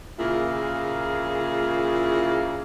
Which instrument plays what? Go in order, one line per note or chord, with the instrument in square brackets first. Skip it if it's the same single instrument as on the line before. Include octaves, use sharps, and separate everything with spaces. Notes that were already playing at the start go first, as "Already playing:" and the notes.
[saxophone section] A#2 C#3 A#3 E4 F4 G#4